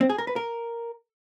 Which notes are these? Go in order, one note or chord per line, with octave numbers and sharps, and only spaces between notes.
C4
G#4
A#4
B4
A#4